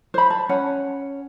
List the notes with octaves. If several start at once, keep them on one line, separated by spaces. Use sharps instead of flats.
C5 B5
A5
C#4 F#5